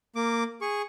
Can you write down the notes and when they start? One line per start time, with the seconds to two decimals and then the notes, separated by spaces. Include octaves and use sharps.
0.16 A#3 D6
0.61 G#4 C#6